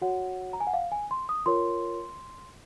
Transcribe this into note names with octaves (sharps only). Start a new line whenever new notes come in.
F#4 C#5 F#5
A#5
G#5
F#5
F5
G#5
C6
D#6
F4 A#4 C#5 C6